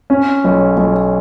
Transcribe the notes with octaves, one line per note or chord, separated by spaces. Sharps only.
C#4
B1
B1